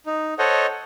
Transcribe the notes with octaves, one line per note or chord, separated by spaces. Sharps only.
D#4
A4 C5 C#5 D#5 F#5